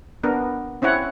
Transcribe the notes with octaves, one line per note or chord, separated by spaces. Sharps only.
B3 D4 A#4
C4 C#4 E4 C#5 F#5